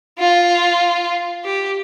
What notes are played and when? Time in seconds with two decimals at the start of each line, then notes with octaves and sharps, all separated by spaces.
0.19 F4
1.45 G4